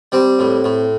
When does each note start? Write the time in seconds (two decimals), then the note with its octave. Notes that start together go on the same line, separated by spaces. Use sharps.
0.12 G3 C4
0.39 A2
0.64 A2